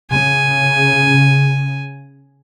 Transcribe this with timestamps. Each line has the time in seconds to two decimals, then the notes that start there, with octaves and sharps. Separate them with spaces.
0.11 C#3 G#5